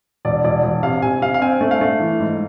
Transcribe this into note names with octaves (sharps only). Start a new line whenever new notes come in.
E1 D5
E1 D5
E1
C3 F5
C3 G#5
C3 F5
F5
C4 G#5
A3
F5
A3
E3
G#2